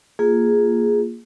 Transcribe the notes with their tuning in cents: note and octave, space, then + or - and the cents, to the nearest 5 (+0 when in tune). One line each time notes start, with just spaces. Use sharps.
A#3 +0 F4 +0 G#4 +0